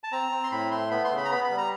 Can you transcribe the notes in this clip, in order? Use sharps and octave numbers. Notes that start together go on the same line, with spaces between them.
A5
C4 A#5
C4
C6
A2 B5
A3 C6
B3 B5
C6
C#3
B5
A#5
B3 B5
B5
G3
A#5